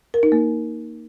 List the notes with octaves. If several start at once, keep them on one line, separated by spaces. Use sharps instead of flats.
A#4
D#4
A#3